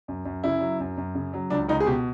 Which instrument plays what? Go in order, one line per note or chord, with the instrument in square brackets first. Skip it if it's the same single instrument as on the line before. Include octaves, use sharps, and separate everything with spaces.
[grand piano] F#2
F#2
C#3 E4
F#3
F#2
F#2
C#3
F#3
C#2 D4
C#2 D#4
G#4
B2 G4